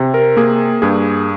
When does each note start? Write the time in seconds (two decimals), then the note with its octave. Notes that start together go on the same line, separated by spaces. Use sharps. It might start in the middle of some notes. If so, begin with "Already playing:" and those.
Already playing: C3
0.14 A#4
0.37 A#3 G#4
0.82 G2 G#4